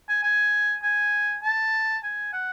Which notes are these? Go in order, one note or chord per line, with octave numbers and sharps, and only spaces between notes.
G#5
G#5
G#5
A5
G#5
F#5